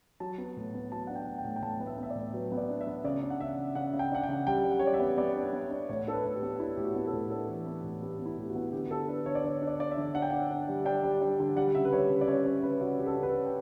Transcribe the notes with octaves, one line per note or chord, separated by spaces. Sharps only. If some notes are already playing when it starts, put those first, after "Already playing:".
F#3 A5
B3
A2
B3
F#3 A5
D4 F#5
G5
A2
G5
A2
G5
A2 A5
B3
E5
B3
E5
D5
A2
F#3 B4
B3
D5
D4
E5
B3
C#3 D5
D4
F#5
C#3 E5
C#3
C#3 F#5
C#3
G5
D4 F#5
G5
C#3
G3 G5
G3
F#5
G3 C#5
D5
E5
B3
B3 D5
D4
B3
D4
A2 C#5
D4 A4
B4
A2
G4
B3
D4 E4
A2 G4
F#4
B3
A4
A2
D4 A4
E3
B3
A2
B3 G4
B3
E4
A2 G4
F#4
B3
D3 G4
G4
D3 A4
D4 B4
D3 C#5
D5
D3 C#5
D4
D5
D4 D5
E5
D3
D4 F#5
G5
D4 F#5
D3
G3
D4 G5
G3
D4
D3
G3 F#5
C#3 E5
B4
G3 C#5
C#3
D5
C#4 C#5
C#4 C#5
C#3 B4
C#3 F#4
C#3 G4
A4
G4
C#3
B4
C#4
G5